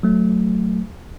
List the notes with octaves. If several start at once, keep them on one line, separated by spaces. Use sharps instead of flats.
F#3 A3